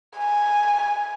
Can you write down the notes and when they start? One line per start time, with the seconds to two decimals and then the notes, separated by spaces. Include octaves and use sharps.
0.17 G#5